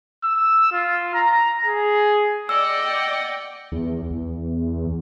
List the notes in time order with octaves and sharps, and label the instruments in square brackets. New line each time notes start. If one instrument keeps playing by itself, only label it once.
[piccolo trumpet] E6
F4
A#5
G#4
[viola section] D5 G5 [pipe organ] D#5 F#5 [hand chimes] E6
[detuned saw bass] E2
E2